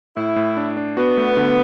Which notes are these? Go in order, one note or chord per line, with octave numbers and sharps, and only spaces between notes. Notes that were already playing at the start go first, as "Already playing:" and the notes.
A2 E4
A2
D4
D4
B3 F#4
A3
D3